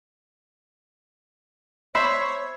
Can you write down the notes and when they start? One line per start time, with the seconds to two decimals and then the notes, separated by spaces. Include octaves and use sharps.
1.95 C5 C#5 E5 B5